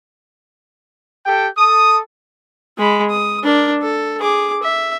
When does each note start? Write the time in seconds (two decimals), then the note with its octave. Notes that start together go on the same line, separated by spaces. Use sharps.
1.26 G4 A4 G5
1.58 A4 D#6
2.78 G#3 B5
3.10 D#6
3.44 D4 A#4
3.82 A4
4.20 G#4 D6
4.63 E5